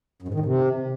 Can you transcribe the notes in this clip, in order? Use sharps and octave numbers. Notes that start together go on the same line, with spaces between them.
F#2
G#2
D#3
A2
C3